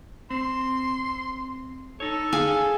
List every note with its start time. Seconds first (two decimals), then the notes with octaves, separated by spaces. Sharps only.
0.31 C4 C6
2.00 D#4 A4 C#5
2.33 G#4 F5 G#5